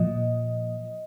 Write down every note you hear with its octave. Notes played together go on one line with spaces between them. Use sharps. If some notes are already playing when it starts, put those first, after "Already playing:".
Already playing: A#2 F3 D#5